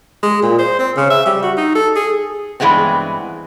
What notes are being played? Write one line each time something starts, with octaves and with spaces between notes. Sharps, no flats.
G#3
A#2
C5
C4
C#3
E5
G3
F#4
D#4
A4
G#4
G2 E3 G#3 B3 C4